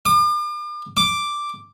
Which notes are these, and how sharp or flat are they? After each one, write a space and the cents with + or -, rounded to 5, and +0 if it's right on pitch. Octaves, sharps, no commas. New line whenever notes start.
D6 +40
D6 +0